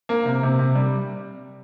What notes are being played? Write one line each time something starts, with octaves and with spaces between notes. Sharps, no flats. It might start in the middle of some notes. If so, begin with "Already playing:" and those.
A#3
C3
C3
C3
G3